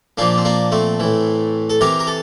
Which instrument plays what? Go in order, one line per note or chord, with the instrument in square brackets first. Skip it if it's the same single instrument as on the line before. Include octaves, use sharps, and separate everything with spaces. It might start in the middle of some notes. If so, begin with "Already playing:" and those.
[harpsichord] A#2 F3 A#3 D4
C4
A#3 D4
A3 C4
A2 E3
A4
C3 E3 G4 A#4
A#4
A4